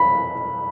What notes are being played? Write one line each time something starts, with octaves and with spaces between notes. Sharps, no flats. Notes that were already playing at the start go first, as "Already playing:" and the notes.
Already playing: B5